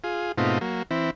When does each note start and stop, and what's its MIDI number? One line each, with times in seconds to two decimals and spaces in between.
0.04 0.32 65
0.04 0.32 68
0.38 0.58 44
0.38 0.58 47
0.38 0.58 57
0.38 0.58 60
0.38 0.58 63
0.38 0.58 65
0.61 0.83 54
0.61 0.83 58
0.91 1.10 52
0.91 1.10 60
0.91 1.10 64